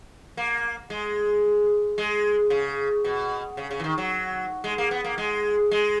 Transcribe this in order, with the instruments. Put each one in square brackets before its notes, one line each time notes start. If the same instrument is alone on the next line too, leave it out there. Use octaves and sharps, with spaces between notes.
[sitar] A#3
G#3
G#3
C#3
B2
C#3
C#3
E3
D#3
F#3
G#3
A#3
B3
A#3
G#3
G#3